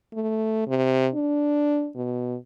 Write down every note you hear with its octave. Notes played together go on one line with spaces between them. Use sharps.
A3
C3
D4
B2